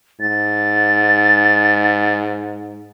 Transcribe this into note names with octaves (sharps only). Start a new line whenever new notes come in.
G#2 A6